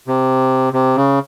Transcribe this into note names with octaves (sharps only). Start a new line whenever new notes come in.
C3
C3
C#3